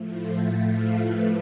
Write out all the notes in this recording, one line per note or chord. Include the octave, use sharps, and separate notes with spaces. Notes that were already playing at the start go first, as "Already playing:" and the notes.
Already playing: A2 F3 A3
C5
F5
B4